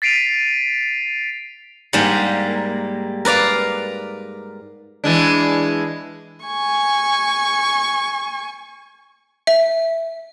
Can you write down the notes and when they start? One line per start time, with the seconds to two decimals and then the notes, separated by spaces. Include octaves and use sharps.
0.02 A6 B6 C7 D7 D#7 F7
1.93 G#2 G3 A#3
3.25 A#4 B4 D5 F5
5.04 E3 G#3 D4
6.45 G#5 C#6
9.47 E5